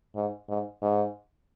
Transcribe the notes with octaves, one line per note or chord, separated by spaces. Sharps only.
G#2
G#2
G#2